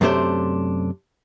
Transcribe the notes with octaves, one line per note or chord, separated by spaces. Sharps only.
F#2 C3 A3 D4 C5